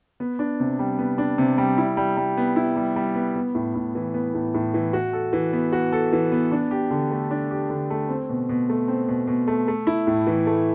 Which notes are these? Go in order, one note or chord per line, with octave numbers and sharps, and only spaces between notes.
B3
D4
C3
G3
B3
D4
C3
G3
E4
G3
G3
B3
E4
G3
G3
B3
B3
A2
A2
E3
B3
A2
A2
E3
F#4
A4
E3
B3
F#4
A4
E3
B3
D4
G4
D3
A3
D4
G4
D3
A3
C4
B2
B2
A3
C4
B2
B2
A3
A3
E4
A2
E3
A3